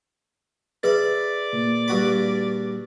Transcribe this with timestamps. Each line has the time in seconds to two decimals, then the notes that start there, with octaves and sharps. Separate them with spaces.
0.83 G#4 B4 D5 E5 B5
1.52 A#2
1.88 G2 F#4 B5